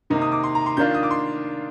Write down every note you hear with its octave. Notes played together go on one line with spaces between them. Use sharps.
C3 D#3 A#3 D#4
D#6
D6
C6
A#5
C6
D#3 A#3 D4 F4 G6
D#6
D6
C6